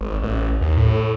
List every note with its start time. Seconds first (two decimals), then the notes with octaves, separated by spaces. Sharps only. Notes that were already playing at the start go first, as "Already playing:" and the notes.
0.01 G#1
0.23 A1
0.61 D#2
0.77 A2